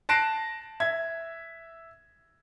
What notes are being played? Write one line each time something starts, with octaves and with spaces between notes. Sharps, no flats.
A5 F#6 A#6 C7 D7 E7
E5 G#6